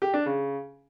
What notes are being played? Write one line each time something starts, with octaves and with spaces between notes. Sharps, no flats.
G4
D4
C#3